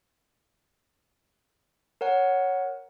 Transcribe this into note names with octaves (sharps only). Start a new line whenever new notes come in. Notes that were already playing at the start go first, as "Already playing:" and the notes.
A#4 C#5 F#5